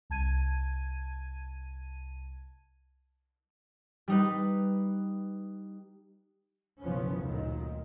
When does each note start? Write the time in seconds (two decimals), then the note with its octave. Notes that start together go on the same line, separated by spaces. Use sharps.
0.10 C2 A5 G#6 D#7
4.08 G3 D#4 B4
6.81 F#1 B1 F3 B3 C#4
7.19 D2 A#2 D#3